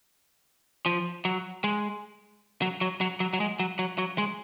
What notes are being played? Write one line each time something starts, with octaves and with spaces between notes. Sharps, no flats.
F3
F#3
G#3
F#3
F#3
F#3
F#3
F#3
G#3
F#3
F#3
F#3
G#3